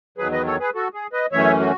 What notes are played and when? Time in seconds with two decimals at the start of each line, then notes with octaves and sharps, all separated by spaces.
0.18 E2 D#3 F#3 G#4 B4
0.32 B4 D#5
0.46 A4 C#5
0.60 G#4 B4
0.75 F#4 A4
0.94 G#4
1.13 B4 D#5
1.32 F#2 E3 A3 C#4 C#5 E5
1.60 F#4